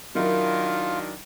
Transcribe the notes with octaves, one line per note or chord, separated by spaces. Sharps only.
D#3 F#3 D4 E4 F4 A#4